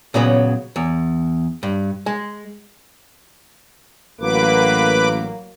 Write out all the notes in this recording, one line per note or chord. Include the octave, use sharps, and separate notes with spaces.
A#2 C#3 F#3 B3
E2
G2
G#3
A1 F#3 A#3 B4 D6